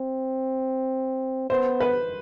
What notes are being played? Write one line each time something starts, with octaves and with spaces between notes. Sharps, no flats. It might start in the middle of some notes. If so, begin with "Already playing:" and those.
Already playing: C4
B3 C5
B4